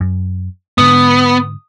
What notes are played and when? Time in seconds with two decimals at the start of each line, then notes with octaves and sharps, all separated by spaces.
0.01 F#2
0.78 G#2 D3 B3 D#6